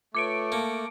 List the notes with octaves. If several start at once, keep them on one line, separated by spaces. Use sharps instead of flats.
A3 F4 B4 C#5 D6 C#7 D7
A#3 A5